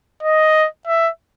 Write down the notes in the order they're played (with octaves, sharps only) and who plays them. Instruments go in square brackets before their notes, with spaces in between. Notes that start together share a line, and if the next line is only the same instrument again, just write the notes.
[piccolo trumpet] D#5
E5